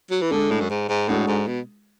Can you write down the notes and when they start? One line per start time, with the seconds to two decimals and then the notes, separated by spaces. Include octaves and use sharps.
0.11 F#3
0.22 E3
0.32 D3 G#3 D4 A4
0.51 A2
0.61 F#2
0.70 G#2
0.89 G#2
1.08 A2 G#3 D4 F#4 A4
1.28 G#2
1.47 B2